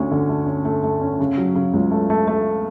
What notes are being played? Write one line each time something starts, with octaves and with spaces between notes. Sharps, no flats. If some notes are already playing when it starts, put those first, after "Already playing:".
Already playing: D2 C#4
D3
A3
C#4
A3
A3
C#4
C#3
F#3
C#3
C#2
A3
A3
A3